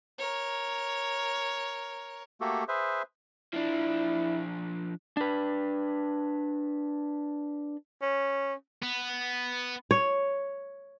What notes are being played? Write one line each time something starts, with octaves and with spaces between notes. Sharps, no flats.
A#4 C#5
A3 A#3 F#4 G4 A4
G#4 B4 C5 E5
F3 D4 E4
D4 B4
C#4
B3
C#5